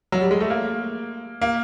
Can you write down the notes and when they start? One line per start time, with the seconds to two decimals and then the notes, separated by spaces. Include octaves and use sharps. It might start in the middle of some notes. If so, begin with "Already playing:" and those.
0.12 F#3
0.21 G3
0.31 G#3
0.40 A3
0.50 A#3
1.41 A#3